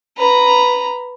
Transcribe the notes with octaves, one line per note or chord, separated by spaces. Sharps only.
B4 A#5